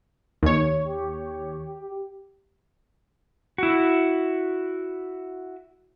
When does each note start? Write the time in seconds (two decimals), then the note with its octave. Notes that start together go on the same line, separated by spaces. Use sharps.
0.43 D#2 C#5
0.85 G4
3.58 E4 F#4